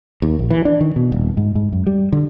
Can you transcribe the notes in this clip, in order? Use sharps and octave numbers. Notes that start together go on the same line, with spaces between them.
D#2
A#1
E3
D4
D#3
B2
D#1
G#2
G#2
F#2
G3
D3